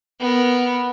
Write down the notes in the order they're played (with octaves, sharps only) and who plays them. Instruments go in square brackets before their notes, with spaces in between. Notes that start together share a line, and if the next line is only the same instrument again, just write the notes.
[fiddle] B3 A#4